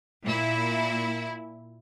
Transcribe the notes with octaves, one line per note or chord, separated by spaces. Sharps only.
A#2 E4